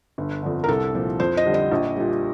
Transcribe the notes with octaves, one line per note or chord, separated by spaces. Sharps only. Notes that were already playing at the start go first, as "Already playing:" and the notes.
G1
F2 D3
A#4
C2 A4
A#2 F3
F2 C5
D#5
D3 G3
D#5
A#1
A#2 G3